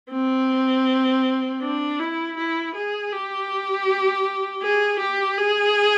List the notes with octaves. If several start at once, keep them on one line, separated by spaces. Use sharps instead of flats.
C4
D4
E4
E4
G#4
G4
G#4
G4
G#4